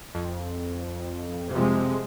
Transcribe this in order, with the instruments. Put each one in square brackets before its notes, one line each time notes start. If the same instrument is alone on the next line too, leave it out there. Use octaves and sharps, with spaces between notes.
[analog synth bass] F2
[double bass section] C3 F3 G#3